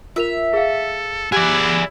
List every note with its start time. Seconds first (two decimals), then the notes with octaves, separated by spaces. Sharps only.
0.16 F4 A#4 E5 F7
0.53 G#4 A4 F5
1.32 E4 G4 G#4 D5 F#5